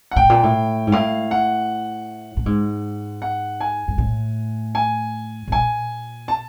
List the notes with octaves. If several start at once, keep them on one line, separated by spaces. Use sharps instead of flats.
F#5
A2 G5
A#2
A2
G#2
A2 F5
F#5
A2
G#2
F#5
G#5
G#2
A2
G#5
A2
A#2 G#5
A5